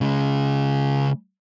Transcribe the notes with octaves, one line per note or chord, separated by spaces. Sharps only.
C#3 G#3